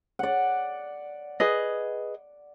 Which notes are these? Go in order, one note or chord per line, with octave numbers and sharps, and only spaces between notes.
D5 F#5
G#4 B4 D#5